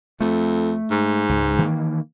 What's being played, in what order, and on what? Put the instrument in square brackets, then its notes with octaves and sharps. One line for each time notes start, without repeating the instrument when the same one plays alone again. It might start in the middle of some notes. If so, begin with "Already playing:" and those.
[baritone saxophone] F2 [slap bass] A3
[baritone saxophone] G#2
[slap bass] C#2
D#3 E3 A#3